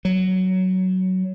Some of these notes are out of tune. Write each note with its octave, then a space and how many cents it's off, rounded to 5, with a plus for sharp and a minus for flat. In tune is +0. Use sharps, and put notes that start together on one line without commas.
F#3 +10